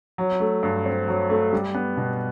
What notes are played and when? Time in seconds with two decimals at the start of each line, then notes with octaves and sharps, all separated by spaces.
0.18 F#3
0.40 A3
0.63 G2
0.86 C4
1.08 F#3
1.30 A3
1.53 G3
1.75 B3
1.97 B2